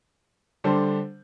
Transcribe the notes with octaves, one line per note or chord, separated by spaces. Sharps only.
D3 G3 D4 A4 C5